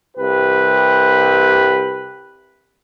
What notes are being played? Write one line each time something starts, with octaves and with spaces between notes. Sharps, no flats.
C2 G4 B4